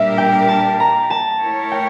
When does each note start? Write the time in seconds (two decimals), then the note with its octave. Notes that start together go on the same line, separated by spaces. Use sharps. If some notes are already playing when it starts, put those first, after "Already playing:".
Already playing: A#2 G3 D4 G4 A#4 E5
0.18 G5
0.49 A5
0.80 A#5
1.10 A5
1.41 A3 E4 A#4 C#5
1.72 G5